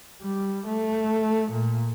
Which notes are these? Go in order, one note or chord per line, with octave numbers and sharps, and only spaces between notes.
G3
A3
A#2